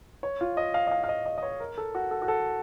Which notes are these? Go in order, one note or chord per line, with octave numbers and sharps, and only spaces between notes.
C#5
F4
D#5
F5
D#5
F5
F5
D#5
D#5
D#5
C#5
A#4
A4
F#4
A4
F#4
A4